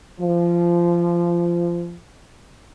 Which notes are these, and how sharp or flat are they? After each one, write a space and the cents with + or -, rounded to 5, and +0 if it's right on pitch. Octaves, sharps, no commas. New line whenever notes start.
F3 -20